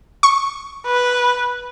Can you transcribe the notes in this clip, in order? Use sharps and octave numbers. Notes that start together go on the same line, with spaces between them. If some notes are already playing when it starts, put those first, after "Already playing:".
C#6
B4